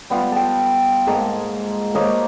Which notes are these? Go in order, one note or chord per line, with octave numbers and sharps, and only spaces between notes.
G3 B3 F4
G5 A5
G#2 G#3 A#3 A5
A#3 C5 C#5 D#5